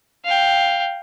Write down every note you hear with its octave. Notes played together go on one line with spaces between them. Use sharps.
F5 G5